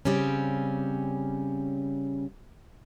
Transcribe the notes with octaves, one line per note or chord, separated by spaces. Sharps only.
C#3 G3 C4 C#4